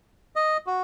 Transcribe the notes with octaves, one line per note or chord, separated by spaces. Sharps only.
D#5
F#4